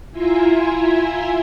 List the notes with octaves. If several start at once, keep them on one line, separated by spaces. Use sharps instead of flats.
E4 F4 E5 G#5 A#5 C6